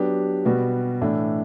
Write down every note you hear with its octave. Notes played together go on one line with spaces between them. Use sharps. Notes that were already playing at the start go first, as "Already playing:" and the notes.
Already playing: F#3 B3 D4 G4
B2 G3 B3 F#4
A2 E3 A3 D4